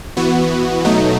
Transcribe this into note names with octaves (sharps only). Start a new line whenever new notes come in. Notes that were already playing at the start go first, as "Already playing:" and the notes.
E3 B3 F#4
B2 F#3 A3 D#4